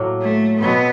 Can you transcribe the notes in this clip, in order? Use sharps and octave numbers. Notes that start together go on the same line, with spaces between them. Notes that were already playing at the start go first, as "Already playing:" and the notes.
Already playing: A2 F#3 A#3
A3
B2 F#3 A3 B3 C4